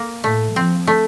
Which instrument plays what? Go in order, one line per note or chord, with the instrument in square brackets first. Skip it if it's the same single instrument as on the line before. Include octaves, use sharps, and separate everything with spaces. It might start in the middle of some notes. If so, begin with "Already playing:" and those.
Already playing: [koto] A#3
[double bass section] A2 [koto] A3
[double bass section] F3 [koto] C4
[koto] A3